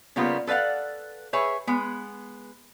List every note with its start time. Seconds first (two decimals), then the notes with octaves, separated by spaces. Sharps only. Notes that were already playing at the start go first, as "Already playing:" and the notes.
0.16 C#3 G3 A#3 B3 F4
0.47 A4 B4 D5 F5 F#5
1.33 G#4 B4 C#5 E5
1.67 G#3 B3